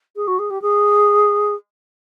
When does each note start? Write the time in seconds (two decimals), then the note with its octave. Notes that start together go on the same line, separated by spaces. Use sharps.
0.16 G#4
0.27 F#4
0.39 G#4
0.50 G4
0.62 G#4